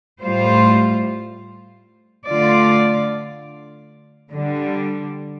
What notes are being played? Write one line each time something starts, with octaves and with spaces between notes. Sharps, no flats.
A2 G3 F4 C5
D3 A3 F4 D5
D3 G3 D4